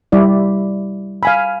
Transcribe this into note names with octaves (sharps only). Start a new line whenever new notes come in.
G3 E4 D5
F5 G#5 B5